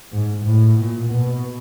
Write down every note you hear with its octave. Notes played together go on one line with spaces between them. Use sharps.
G#2
A2
A#2
B2